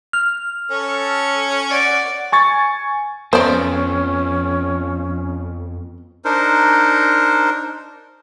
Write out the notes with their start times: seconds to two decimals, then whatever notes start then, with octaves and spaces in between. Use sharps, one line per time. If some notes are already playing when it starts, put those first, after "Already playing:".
0.13 F6
0.71 C#4 A4 C#6
1.72 D5 F#5
2.32 G#5 C#6 A6
3.33 F2 B3 C#4 C5 D5
6.25 D4 D#4 A#4 C5